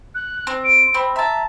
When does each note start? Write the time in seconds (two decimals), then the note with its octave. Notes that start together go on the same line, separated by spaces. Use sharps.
0.15 F#6
0.47 C4
0.64 D7
0.94 C4 B5
1.16 E5 A5 A#5